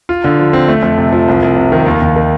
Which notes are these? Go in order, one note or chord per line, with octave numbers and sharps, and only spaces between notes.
F4
D3
F3
C4
A3
F2
C3
F3
C2
C2
C3
D#3
D#2
D#2
D#3